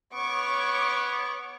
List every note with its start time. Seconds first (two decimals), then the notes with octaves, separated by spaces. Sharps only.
0.14 B3 C#5 C#6 D6